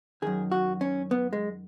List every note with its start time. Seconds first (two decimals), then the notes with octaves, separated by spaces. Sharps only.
0.22 F#2 D#3 G#4
0.52 F#4
0.81 C#4
1.11 B3
1.33 G#3